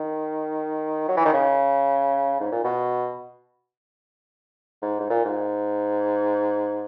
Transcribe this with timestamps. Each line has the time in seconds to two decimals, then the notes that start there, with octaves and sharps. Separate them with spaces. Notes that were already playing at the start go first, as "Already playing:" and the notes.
Already playing: D#3
1.08 F#3
1.17 E3
1.25 D#3
1.33 C#3
2.41 G#2
2.52 A#2
2.64 B2
4.82 G#2
5.00 G#2
5.10 A#2
5.25 G#2